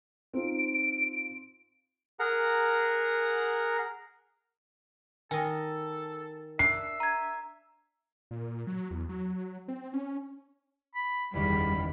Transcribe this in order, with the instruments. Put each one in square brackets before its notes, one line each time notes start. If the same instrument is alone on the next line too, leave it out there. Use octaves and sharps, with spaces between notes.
[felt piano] C4 D#4 F4 [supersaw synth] D7
[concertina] G#4 A#4 F#5 A#5
[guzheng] D#3 D#5 [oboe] A4 [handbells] G#5
[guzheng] D4 [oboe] E5 [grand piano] C7
[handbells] A#5 G#6
[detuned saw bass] A#2
F#3
E2
F#3
C4
C#4
[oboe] B5
[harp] F#1 E2 D#3 [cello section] G3 [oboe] B5